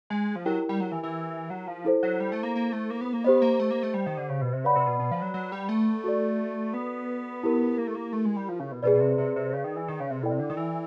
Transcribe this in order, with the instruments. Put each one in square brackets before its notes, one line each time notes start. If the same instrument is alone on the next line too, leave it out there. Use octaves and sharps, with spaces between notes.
[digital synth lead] G#3
F3
[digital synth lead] F#3 [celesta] E4 G4 A#4 D#5 G5
[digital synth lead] G3
F#3
E3
E3
F#3
F3
[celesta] E4 A4 C5
[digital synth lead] F#3
G3
A3
A#3
A#3
A3
A#3
B3
A#3
[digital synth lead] B3 [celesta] G4 C5 D#5
[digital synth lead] A#3
A3
A#3
A3
G3
D#3
D3
C#3
B2
C3
[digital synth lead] C#3 [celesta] B4 D5 F#5 B5
[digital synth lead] C3
B2
B2
F3
F#3
F#3
G3
A3
[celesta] F#4 A4 D5
[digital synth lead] B3
[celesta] E4 G4 A#4
[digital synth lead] A#3
A3
A#3
A3
G#3
G3
F3
C#3
B2
[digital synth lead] B2 [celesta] G#4 B4 D5
[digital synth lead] B2
C3
C3
C3
C#3
D#3
E3
D#3
C#3
C3
[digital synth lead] B2 [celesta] E4 A4 D5 G5
[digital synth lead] C3
D3
D#3
E3